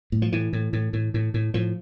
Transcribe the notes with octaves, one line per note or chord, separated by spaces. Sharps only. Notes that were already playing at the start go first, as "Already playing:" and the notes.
A2
F3
A2 E3
A2
A2
A2
A2
A2
A2 F3